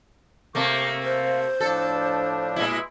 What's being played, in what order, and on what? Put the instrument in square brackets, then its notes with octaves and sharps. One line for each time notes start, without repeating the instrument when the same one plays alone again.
[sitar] C3 A3 A#3 [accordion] C#6 D6 G6
[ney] C5 [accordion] F5
[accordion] A2 F3 D4 [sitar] A4
[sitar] A#2 G#3 E4